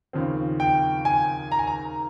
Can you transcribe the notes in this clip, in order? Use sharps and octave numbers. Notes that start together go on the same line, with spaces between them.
D#2 C#3 F3 C4
G5
G#5
A#5
G#5
A#5